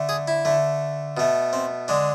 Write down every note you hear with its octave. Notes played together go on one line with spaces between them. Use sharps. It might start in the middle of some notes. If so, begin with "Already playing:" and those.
Already playing: D3 A3
G#4
E4
D3 A3
B2 A3
C4
D3 G#3 D4